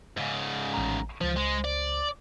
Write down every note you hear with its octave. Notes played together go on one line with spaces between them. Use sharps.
G#2 C#3
A1 A#5
C#2 F3 C5
G#3
D5